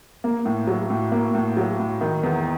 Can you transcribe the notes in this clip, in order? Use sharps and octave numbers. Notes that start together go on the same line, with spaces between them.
A#3
A2
F#3
A2
A#3
A2
F#3
A2
D#3
E2